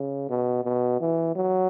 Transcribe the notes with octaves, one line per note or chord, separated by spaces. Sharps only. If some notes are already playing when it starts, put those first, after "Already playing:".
Already playing: C#3
B2
B2
E3
F#3